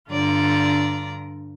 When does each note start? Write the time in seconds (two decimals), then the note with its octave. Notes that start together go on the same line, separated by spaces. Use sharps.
0.10 G2 D3 F4 D5 A#5